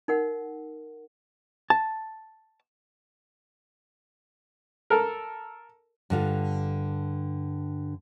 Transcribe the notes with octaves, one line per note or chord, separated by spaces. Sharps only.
D#4 A#4 F#5
A5
A4 A#4
G2 D3 F4